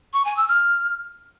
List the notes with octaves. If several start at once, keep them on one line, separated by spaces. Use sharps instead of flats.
C#6
G#5
E6
F6